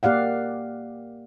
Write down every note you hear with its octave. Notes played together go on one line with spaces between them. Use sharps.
A#3 G4 D5 F5 F#5